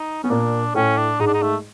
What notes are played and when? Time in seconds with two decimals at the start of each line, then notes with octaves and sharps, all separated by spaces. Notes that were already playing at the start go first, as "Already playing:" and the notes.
Already playing: D#4
0.23 B3 C#4
0.30 A#2 A#3 D4
0.74 A2 A3 C#4
0.97 D4
1.19 G#2 G#3 D#4
1.27 D4
1.34 D#4
1.42 A3